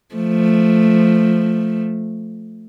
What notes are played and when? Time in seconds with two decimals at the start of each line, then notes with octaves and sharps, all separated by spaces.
0.15 F3 A3